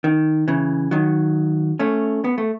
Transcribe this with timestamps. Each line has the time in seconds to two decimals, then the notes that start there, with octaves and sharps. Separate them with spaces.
0.04 D#3
0.48 C#3 E3
0.91 D#3 F#3
1.80 A3 C#4
2.24 B3
2.38 A3